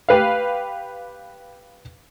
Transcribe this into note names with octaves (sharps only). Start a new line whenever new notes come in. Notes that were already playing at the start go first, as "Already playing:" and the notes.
G4 B4 F5